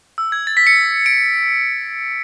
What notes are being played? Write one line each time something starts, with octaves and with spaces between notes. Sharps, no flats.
E6
G#6
A6
B6
C#7
D7